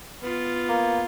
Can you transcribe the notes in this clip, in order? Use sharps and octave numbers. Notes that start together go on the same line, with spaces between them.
B3 F4
A#3